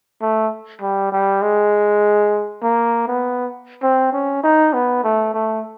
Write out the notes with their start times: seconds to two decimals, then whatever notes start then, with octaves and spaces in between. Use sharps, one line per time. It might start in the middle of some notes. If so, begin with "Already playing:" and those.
0.22 A3
0.82 G3
1.12 G3
1.42 G#3
2.63 A#3
3.08 B3
3.83 C4
4.13 C#4
4.43 D#4
4.73 B3
5.04 A3
5.34 A3